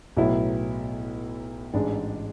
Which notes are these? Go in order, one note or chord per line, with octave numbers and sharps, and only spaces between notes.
B1 A2 F#3 B3 E4
A1 G#2 G#3 D4